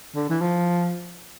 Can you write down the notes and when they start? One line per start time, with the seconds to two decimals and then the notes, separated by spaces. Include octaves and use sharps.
0.15 D3
0.29 E3
0.41 F3